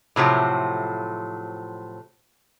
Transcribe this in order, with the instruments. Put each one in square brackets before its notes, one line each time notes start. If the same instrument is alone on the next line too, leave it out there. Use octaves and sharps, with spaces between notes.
[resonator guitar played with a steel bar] A2 C3 F3 F#3